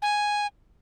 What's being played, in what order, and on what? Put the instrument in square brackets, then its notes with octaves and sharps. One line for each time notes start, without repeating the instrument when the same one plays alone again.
[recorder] G#5